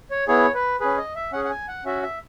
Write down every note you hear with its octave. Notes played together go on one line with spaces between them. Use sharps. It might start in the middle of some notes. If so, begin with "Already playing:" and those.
C#5
B3 E4 G#4 C#5
B4
C#4 G#4 B4
D#5
E5
C#4 G#4 F#5
F#5
G#5
F#5
C#4 F#4 E5
E5